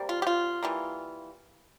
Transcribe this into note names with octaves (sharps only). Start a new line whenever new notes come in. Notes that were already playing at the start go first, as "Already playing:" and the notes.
Already playing: C3 G3 A#3
F4
G4
F4
E3 G3 A#3